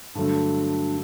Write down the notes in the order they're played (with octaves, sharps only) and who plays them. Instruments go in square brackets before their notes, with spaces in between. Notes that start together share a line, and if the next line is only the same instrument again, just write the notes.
[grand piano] G2 D3 F#3 A3 [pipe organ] D4